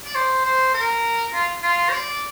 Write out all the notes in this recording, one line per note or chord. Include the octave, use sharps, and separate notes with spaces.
D5
C5
C5
A#4
F4
F4
C5
D5